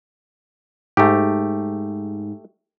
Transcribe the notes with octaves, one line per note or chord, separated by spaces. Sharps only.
G#2 A3 G4